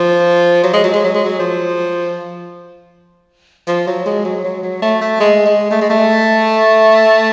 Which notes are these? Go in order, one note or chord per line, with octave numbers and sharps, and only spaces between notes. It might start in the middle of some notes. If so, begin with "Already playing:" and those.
Already playing: F3
F#3
G#3
F#3
G#3
F#3
G#3
F#3
F3
F3
F#3
G#3
F#3
F#3
F#3
A3
A3
G#3
G#3
A3
G#3
A3